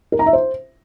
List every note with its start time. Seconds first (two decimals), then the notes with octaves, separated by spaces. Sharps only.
0.12 A#4
0.19 A#5
0.26 E5
0.33 C5